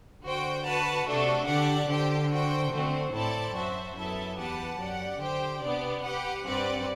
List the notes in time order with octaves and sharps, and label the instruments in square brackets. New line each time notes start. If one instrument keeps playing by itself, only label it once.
[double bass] D3 [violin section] F#4 C5 G5
[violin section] F#4 B4 F#5 A5
[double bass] C3 [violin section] A3 D4 F#4 A4
[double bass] D3 [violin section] D4 G4 D5 F#5
[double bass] D3 [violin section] G4 C5 G5
[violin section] F#4 C5 G5
[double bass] D3 [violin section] A3 C4 F#4 C5
[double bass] A2 [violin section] C4 E4 A4 D5 A5
[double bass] F#2 [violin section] F#4 C5 E5 A5
[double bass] F#2 [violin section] B3 E4 A4 E5 A5
[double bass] E2 [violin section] G4 B4 F#5 A5
[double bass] F#2 [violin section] G4 D5 F#5
[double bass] D3 [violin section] G4 C5 G5
[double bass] C3 [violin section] B3 D4 G4 D5
[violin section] G4 B4 F#5
[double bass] G2 [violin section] C4 G4 B4 D5 F#5